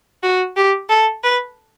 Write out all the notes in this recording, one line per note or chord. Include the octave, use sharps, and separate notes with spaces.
F#4
G4
A4
B4